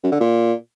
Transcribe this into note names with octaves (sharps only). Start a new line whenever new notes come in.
F#2
D3
A#2